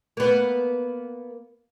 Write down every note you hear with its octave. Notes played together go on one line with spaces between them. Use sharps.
A#3 B3